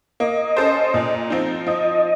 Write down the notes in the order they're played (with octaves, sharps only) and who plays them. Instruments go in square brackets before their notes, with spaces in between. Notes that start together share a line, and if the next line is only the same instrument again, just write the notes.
[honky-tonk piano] A#3 [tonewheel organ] D#5
[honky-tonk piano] C#4 A4 C5
A#2
F3 C4 D#4
[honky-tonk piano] F3 [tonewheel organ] D#5